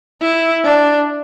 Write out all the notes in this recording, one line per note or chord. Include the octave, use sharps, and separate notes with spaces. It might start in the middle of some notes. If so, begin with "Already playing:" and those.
E4
D4